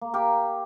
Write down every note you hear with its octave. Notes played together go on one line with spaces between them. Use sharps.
A#3
G4 A#4